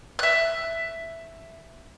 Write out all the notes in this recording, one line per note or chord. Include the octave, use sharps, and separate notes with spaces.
E5 F#6